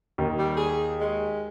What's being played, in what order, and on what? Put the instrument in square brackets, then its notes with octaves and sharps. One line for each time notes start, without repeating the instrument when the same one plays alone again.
[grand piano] D#2
[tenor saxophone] G3
G#4
G#3